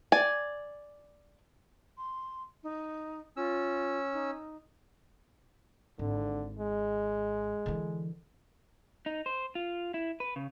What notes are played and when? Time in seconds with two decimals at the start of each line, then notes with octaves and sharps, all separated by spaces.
0.12 D5 G#5
1.98 C6
2.63 D#4
3.37 C#4 F4 E6
4.13 D#4
5.99 G#1 D3
6.59 G#3
7.66 D3 E3
9.06 D#4
9.26 C5
9.55 F4
9.94 E4
10.20 B4
10.36 C#3